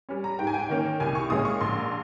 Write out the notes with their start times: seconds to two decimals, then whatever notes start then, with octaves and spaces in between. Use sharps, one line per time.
0.09 G3 C#4
0.24 A#5
0.39 G#2 G5
0.47 G#5
0.54 G5
0.69 D#3 A#3 C#4
1.00 C2 G#5
1.15 C#6
1.30 A#2 G#3 C#4 D#6
1.45 C#6
1.61 A#1 C6